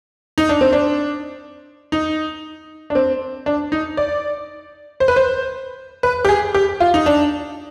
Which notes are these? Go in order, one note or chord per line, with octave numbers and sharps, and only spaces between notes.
D#4
D4
C4
D4
D#4
D4
C4
D4
D#4
D5
C5
B4
C5
B4
G4
G#4
G4
F4
D#4
D4